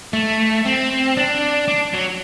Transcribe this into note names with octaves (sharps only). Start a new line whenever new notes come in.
A3
C4
D4
D4
F#3